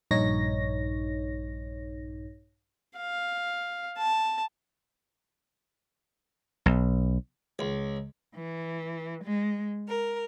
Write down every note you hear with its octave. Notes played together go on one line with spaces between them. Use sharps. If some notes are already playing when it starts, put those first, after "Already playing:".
A#1 G2 D#4 C#5 A#6
F5
A5
B1
C#2
E3
G#3
A#4